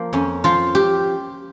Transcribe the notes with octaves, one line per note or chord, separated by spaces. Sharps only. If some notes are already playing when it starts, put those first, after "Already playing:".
Already playing: F3 A#3
F2 C#4
F3 F4
G4